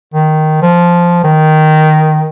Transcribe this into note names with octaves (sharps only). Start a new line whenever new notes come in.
D#3
F3
D#3